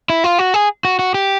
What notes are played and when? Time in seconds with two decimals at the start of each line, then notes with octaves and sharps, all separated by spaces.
0.10 E4
0.24 F4
0.39 F#4
0.54 G#4
0.85 F#4
0.99 F#4
1.14 G4